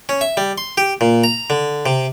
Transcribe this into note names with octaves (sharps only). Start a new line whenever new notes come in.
C#4
E5
G3
C6
G4
A#2
A#5
D3
C3